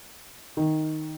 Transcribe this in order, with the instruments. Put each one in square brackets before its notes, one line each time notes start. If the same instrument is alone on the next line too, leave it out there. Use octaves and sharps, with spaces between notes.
[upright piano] D#3